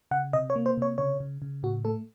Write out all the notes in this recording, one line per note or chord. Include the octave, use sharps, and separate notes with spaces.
C#3 F#5
C3 D#5
C#5
A#3
C5
C3 C#5
C#3 C#5
C#3
C#3
A2 F#4
A3 A4